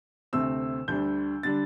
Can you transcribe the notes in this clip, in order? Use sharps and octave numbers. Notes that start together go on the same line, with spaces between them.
D2 C3 A3 C4 E6
D2 D3 G3 D4 G6
D3 G3 D4 A6